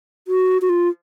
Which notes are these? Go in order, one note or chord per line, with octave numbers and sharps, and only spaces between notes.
F#4
F#4
F4